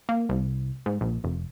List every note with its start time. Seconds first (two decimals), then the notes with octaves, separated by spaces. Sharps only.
0.09 A#3
0.29 C2
0.86 G#2
1.01 A#1
1.24 F1